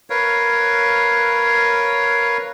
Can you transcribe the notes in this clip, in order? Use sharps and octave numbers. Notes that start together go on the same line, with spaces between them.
A#4 B4 C#5 F5